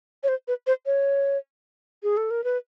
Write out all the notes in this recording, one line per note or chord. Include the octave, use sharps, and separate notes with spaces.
C#5
C5
B4
C5
C#5
G#4
A4
A#4
B4